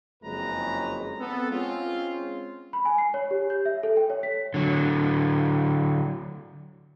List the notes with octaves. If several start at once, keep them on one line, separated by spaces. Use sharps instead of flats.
F#1 F2 G#3 C#4 B4 A#5
B3 C4 A4
G#3 C4 C#4 F4
B5
G#5
C7
C#5
G4
G6
E5
A4
G5
C#5
B6
D3 F#3